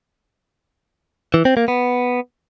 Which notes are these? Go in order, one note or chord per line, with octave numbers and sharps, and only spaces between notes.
E3
C4
A#3
B3